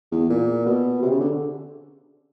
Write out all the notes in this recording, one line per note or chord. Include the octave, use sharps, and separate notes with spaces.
E2
A#2
B2
C3
C#3
D3